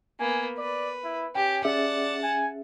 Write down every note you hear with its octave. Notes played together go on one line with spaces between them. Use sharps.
A#3 B3 G#5
B4 D5
E4
C#4 G4 G5
C#4 G#4 D5 E5 F#5 A5
G#5